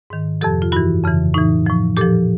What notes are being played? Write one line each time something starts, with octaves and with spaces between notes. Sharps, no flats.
G#2 D#3
F2 C3 F3 G4 A4
F4
G2 E3 E4 F#4
F2 C#3 E3
A2 E3 D#4
A2 F3
A#2 F3 G4 A4